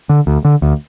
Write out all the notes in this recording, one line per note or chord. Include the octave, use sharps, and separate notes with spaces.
D3
D2
D3
D2